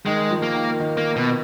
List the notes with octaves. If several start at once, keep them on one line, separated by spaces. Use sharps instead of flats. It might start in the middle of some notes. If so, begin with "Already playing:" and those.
D#3 G#3
F3
A#3
D#3
D#3
A#3
B2